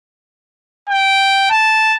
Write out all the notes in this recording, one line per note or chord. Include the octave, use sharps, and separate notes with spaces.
G5
A5